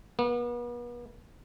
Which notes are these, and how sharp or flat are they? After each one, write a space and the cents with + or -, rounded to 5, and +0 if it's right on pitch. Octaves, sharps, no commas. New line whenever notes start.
B3 -40